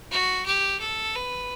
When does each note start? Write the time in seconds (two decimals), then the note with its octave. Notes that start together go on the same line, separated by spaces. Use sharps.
0.11 F#4
0.46 G4
0.80 A4
1.16 B4